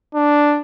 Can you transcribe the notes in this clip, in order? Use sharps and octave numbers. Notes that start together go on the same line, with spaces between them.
D4